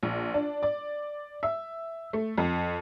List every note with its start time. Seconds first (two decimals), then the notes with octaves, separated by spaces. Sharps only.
0.03 A#1
0.34 D4
0.63 D5
1.43 E5
2.13 A3
2.38 F2